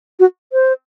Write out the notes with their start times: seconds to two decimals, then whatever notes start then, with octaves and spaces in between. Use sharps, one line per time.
0.20 F#4
0.53 C5